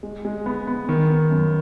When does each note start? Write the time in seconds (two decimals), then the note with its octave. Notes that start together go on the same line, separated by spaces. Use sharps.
0.03 G#3
0.25 G#3
0.46 B3
0.67 B3
0.89 D#3
1.09 B3
1.30 F#2